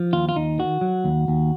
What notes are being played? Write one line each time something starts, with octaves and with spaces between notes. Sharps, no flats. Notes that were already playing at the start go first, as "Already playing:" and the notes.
Already playing: F3
D#2 F4
F4
D#2 D#4
D#3 F#4
F#3
D#2
D#2